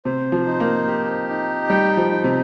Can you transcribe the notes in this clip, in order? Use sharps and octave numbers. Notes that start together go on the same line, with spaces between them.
C3 C5
F3
D#4
A#3
G4
D#4
G3 G5
F3
D#4
C3